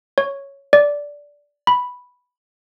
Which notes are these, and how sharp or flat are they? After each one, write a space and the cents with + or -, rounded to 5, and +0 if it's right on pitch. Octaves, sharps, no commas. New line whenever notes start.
C#5 +0
D5 -10
B5 +0